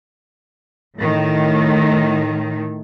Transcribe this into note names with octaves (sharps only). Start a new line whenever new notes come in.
A2 D#3